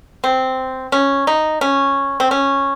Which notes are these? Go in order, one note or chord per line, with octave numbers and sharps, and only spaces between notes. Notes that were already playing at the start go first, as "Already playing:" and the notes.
C4
C#4
D#4
C#4
C4
C#4